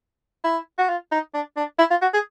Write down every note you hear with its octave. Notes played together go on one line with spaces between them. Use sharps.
E4
F#4
F4
D#4
D4
D4
E4
F4
F#4
G#4